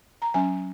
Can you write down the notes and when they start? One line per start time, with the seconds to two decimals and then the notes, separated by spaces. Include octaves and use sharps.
0.22 A#5
0.34 F#3 C#4 G#5